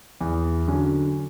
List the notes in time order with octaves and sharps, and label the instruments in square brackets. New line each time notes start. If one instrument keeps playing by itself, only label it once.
[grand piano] E2
D3 F#3 C#4